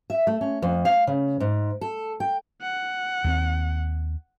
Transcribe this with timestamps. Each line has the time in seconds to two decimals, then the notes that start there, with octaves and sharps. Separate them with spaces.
0.10 E5
0.27 A3
0.41 C#4
0.62 F2
0.85 F5
1.07 C#3
1.40 G#2
1.81 A4
2.20 G5
2.62 F#5
3.24 D#2 G#3 C4